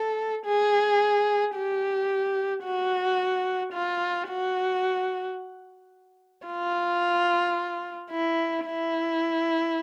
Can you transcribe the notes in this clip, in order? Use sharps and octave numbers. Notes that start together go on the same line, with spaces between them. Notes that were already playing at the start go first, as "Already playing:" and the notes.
Already playing: A4
G#4
G4
F#4
F4
F#4
F4
E4
E4